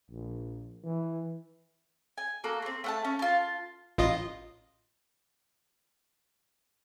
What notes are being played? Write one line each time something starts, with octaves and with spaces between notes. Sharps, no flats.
A#1
E3
G#5
A#3 F#4 A4
A3 C4
A3 F#5 A5
C#4
F4 A5
A1 F4 D#5